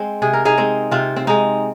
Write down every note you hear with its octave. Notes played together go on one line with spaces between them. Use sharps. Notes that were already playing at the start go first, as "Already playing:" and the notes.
Already playing: G#3 C4
C3 G#4
A#4
D#4 G#4
G#3 C4
C3 C4 F4
C4
G#3 C4 D#4